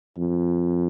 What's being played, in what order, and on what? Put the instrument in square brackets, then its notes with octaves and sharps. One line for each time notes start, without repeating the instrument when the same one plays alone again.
[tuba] F2